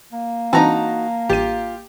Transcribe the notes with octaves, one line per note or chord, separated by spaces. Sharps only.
A#3
E3 C4 D#4 F#4 A5 A#5
A1 F4 G4 D#7